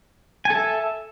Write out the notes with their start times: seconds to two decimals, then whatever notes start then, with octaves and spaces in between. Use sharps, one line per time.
0.45 G#5
0.50 A4
0.55 E5